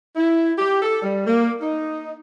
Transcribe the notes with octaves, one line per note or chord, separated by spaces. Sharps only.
E4
G4
A4
G3
A#3
D#4